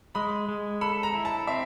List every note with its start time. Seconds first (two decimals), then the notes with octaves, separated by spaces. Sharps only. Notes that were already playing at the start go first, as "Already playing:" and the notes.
0.15 G#3 B5
0.49 G#3
0.81 A4 B5
1.03 A#5
1.14 E4
1.25 A5
1.47 C4 E5